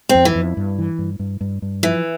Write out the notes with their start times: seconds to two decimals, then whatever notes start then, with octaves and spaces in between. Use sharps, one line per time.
0.09 C4
0.15 F2
0.25 E3
0.35 F2
0.57 G2
0.78 E3
0.99 G2
1.19 G2
1.41 G2
1.62 G2
1.83 E3 F3